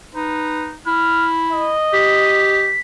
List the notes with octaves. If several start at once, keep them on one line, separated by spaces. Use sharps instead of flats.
D#4 B4
E4 F6
D#5
G4 B6